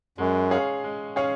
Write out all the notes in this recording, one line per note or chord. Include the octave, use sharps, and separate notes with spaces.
F#2 G#3
C#4 G#4 C#5 F5
G#3
C#4 G#4 C#5 F5